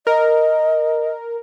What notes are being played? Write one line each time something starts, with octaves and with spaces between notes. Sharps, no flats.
A#4 D#5